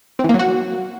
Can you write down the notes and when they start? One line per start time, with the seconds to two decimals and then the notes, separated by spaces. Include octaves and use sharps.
0.19 C4
0.24 E3
0.29 A#3
0.34 F#3
0.39 F#4